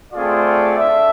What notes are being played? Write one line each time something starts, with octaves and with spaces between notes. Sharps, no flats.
A3 C4 F4 G#4 D5
D4 A4 E5